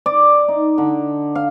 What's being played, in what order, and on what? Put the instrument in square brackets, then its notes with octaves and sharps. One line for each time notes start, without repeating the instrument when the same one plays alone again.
[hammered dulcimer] D5
D#4
D3
F5